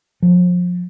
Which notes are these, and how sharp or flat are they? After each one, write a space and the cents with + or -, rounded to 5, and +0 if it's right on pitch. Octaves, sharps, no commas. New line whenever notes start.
F3 +30